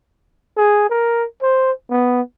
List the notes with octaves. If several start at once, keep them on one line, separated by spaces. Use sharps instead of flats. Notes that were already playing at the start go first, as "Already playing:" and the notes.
G#4
A#4
C5
B3